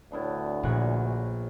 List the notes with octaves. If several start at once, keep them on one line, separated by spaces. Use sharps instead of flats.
D2 A2 B3 D4
A#1 A#2 C#5 F#6